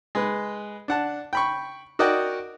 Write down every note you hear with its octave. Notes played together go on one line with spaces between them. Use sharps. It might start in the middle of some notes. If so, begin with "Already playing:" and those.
G#3 B4
D4 F#5 A5
G5 B5 C#6
F#4 A#4 D5 D#5 F#5 G5